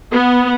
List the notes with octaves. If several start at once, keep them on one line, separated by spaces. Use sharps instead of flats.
B3